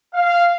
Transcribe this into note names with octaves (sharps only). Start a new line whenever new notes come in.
F5